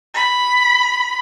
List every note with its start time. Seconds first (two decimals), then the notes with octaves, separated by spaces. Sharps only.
0.14 B5